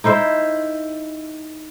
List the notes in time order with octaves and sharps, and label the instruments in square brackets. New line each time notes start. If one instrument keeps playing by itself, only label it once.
[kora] D#4 E4 C5 E5